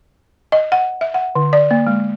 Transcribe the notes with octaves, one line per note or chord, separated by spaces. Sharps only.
D#5
F#5
E5
F#5
D3
D5
A#3
G#3